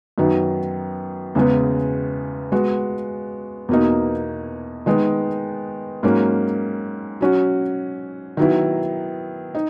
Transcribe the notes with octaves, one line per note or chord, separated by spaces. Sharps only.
F#2 D#3 F#3 B3
E2 C#3 G#3 B3
G#3 B3 F#4
E2 B2 A#3 D#4
D#3 G#3 B3 D#4
G#2 F#3 A#3 C#4
F#3 C#4 F#4
D#3 F#3 B3 E4
D#4